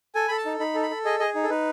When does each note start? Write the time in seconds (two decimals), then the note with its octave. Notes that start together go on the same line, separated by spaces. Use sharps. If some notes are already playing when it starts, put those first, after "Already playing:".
0.15 A4 G#5
0.28 A4 B5
0.37 A5
0.46 D#4
0.59 D#4 B5
0.75 A4
0.83 B5
0.90 A4
1.05 G#4 D#5
1.19 G#4 D#5
1.35 D#4
1.43 A4
1.50 D#4 B4